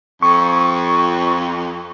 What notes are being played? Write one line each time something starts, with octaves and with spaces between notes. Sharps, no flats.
F2 C#6